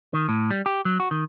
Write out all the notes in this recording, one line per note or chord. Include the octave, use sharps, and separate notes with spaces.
D#3
A2
G3
G4
F#3
F#4
D#3